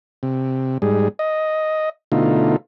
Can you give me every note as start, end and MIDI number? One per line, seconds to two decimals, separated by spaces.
0.23 0.78 48
0.82 1.08 44
0.82 1.08 55
0.82 1.08 68
1.19 1.89 75
2.12 2.56 47
2.12 2.56 50
2.12 2.56 57
2.12 2.56 63
2.12 2.56 65